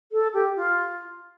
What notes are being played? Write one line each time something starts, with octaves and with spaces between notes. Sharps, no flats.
A4
G4
F4